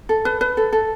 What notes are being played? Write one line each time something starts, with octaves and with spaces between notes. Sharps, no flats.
A4
B4
B4
A4
A4